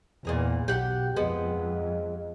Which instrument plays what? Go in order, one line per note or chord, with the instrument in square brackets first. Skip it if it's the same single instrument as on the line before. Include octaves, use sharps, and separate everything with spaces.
[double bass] E2 [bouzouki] A#2 G#4 A#5
[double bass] B1 [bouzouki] G4 F#5
[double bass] F2 [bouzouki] G#3 B3